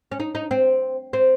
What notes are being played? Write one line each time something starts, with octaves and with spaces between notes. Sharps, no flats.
C#4
D#4
D#4
C4
C4